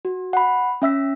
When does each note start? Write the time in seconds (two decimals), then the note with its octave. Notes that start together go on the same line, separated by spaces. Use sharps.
0.05 F#4
0.33 F#5 B5
0.82 C#4 E5 E6 B6